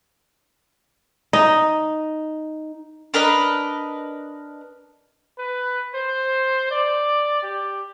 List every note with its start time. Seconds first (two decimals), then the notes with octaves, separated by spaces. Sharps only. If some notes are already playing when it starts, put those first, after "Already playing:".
1.33 D#4
3.14 D4 A#4 B4 D#5
5.38 B4
5.95 C5
6.71 D5
7.42 G4